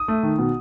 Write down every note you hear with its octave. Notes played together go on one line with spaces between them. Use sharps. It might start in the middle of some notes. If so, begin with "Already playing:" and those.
Already playing: D#6
A3
D#3
B2